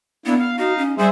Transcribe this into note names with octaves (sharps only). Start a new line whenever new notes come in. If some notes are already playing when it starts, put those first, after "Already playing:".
A#3 B3 D4 E4
F5
D#4 F#4 F5
C#4
G3 G#4 C5 E5